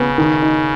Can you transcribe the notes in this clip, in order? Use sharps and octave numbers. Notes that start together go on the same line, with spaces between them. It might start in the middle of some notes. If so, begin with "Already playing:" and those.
Already playing: C#3 B3
D#3
D#4